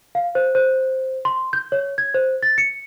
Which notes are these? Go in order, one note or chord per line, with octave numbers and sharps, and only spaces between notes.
F5
C5
C5
C6
G6
C#5
G#6
C5
A6
C#7